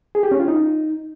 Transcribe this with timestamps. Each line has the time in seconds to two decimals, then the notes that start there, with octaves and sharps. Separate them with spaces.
0.15 G#4
0.23 G4
0.31 C#4
0.40 F4
0.48 D#4